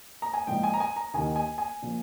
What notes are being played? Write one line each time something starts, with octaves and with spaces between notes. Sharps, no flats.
A#5
G#5
A#1 G#2 F3 G5
G#5
A#5
G#5
A#5
D#2 D#3 G#5
G#5
G#5
A#2 F3